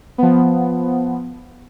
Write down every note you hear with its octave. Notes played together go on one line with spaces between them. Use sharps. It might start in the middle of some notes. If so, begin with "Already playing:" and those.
F3 B3